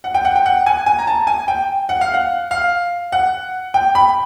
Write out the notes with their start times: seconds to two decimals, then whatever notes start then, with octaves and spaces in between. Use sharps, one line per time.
0.04 F#5
0.14 G5
0.25 F#5
0.36 G5
0.46 F#5
0.66 G#5
0.86 G#5
0.99 A#5
1.07 A5
1.27 G#5
1.48 G5
1.89 F#5
2.01 F5
2.14 F#5
2.51 F5
3.12 F#5
3.74 G5
3.95 B5